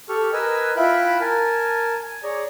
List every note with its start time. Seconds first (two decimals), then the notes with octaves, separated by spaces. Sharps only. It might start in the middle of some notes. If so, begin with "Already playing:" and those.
0.09 G4 A4 C#6 F6
0.33 A#4 B4 D#5 G#5 E6
0.77 E4 F4 E5 G5 B5 F#6
1.21 A#4 G#5 A5
2.02 G#5
2.23 G#4 C#5 D5 A#5